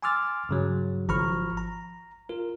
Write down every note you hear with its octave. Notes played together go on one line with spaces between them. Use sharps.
G#5 C6 D6 E6 F6 A6
G2 C#3 F#3
G#1 F3 A#5 B5 C#6 F6
A#5
F4 A#4